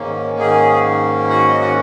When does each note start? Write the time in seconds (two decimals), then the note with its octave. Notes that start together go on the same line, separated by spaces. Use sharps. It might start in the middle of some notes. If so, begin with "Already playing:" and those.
Already playing: G#2 D#3 A#3 C#4
0.39 G#4
1.29 F#4 F#5
1.49 D#5
1.61 F#5